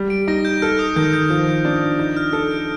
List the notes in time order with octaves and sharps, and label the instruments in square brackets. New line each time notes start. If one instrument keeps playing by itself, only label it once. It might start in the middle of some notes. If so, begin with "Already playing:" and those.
Already playing: [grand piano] G3
[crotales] D7
[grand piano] D#4 [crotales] A#6
[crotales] G6
[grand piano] A4 [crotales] F6
[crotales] D#6
[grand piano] D#3 [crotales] G6
[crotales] G6
[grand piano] F3
D4
[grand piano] D#4 [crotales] G6
[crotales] F6
[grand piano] A4 [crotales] F6
[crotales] D7